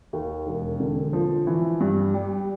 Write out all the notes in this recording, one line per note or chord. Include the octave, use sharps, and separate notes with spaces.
D#2
E1
D3
F3
E3
G2
G3